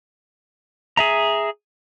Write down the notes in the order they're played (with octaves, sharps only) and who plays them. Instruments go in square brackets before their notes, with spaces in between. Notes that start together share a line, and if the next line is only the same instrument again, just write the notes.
[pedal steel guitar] G#4 E5 A#5